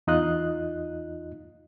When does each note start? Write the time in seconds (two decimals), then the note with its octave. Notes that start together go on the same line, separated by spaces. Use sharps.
0.07 E2 D#4 F4 D#5 F#6